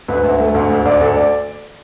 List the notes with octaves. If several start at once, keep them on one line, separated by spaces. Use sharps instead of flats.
D2 B4
D2 E5
A3
D2
D2
D2 D5
D2 A4
D5